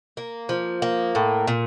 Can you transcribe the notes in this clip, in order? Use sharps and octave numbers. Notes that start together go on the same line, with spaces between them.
A#3
F3
A#3
A2
A#2